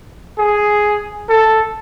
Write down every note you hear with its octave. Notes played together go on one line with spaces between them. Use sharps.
G#4
A4